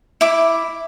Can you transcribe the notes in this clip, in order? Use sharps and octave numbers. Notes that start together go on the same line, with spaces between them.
E4 D6